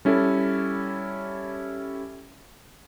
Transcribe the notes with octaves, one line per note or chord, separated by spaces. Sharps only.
G3 C#4 E4 A4